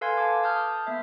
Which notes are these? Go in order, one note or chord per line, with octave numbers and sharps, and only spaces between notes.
A4 B4 F5 G#5 C6 G#6
A5 D6
A5 D#6 F6 G6
A#3 B3 E5